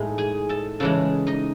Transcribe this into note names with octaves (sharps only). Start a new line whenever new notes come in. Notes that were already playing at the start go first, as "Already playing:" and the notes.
Already playing: A2 G#3 D#4
G#4 G#5
A4 A5
C#3 E3 G#3 A4 A5
D#4 D#5